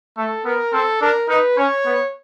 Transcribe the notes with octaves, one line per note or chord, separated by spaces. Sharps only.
A3 A4
B3 A#4
C4 A4
D4 A#4
D#4 B4
C#4 C#5
B3